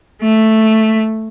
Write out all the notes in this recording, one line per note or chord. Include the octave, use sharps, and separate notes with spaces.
A3